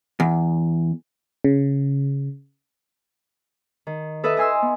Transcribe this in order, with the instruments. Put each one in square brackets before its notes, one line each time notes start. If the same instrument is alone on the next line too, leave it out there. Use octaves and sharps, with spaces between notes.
[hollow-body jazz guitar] E2
[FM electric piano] C#3
[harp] D#3
A4 B4 D#5 E5
D#5 G#5 C6 E6
B3